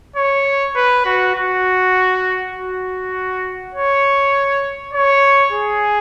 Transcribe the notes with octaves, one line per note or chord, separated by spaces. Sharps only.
C#5
B4
F#4
F#4
F#4
C#5
C#5
G#4